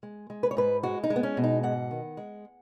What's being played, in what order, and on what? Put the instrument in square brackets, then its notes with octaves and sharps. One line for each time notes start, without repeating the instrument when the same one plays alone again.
[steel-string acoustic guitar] G#3
G#3
B4
C#5
G#2 B4
G#3 F#4
D#4
G#3
B3
C#4
B2
D#4
G#2 F#5
D#3
G#3